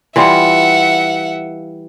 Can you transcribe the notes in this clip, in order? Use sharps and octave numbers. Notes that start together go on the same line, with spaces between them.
E3 G3 F4 E5 F#5